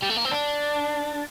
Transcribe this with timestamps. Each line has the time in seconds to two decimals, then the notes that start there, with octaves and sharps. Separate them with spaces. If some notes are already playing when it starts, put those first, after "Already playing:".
0.02 G3
0.10 A3
0.17 A#3
0.25 C4
0.31 D4